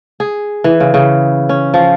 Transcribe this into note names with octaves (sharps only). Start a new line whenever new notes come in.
G#4
E3
C#3
C#3
C#4
F3